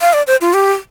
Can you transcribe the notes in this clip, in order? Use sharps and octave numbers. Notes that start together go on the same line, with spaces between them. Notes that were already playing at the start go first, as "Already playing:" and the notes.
F5
D5
C5
F4
G4